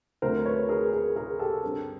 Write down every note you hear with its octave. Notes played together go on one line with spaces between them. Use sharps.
D2 D3 F#3 A3 C4 A#4 C5
B4 C#5
G#4 A#4
G#4 A#4
G#4 A#4
G4 A4
G2 D3 G3 C4